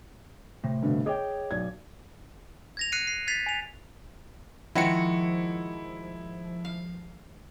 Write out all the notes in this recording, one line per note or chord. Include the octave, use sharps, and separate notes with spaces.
A2 C3
G2 B2 D3
G#4 C#5 D#5 G5 D6
B1 D5 G#6
G#6 A#6 F7
F#6 C7 C#7 D#7
C7
G#6 A6 B6 C7 F7
G#5 F7
D#3 F3 G#3 E4 F#4 C#7
F5